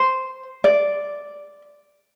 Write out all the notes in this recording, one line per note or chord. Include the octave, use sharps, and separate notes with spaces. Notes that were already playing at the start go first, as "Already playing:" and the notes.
Already playing: C5
D5